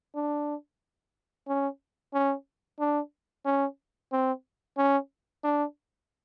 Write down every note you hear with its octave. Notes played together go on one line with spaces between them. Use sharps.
D4
C#4
C#4
D4
C#4
C4
C#4
D4